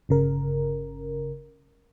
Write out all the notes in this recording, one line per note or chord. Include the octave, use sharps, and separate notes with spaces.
G1 C#3 A#4